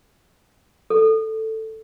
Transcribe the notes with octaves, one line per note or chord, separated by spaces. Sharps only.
A4